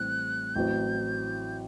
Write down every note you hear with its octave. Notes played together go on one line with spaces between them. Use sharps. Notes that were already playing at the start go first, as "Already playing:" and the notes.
Already playing: A1 A2 G3 C4 G4 F#6
A1 A2 F#3 C4 G6